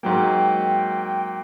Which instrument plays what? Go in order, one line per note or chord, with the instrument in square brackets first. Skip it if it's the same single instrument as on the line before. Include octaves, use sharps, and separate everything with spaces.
[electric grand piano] G#2 F#3 A#3 [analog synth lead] G5